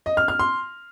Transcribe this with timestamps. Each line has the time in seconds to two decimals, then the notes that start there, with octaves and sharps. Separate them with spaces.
0.06 D#5
0.17 F6
0.28 F6
0.39 C6